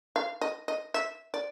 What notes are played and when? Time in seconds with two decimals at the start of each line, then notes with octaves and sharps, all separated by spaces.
0.16 F5
0.41 D#5
0.68 D#5
0.94 E5
1.34 D5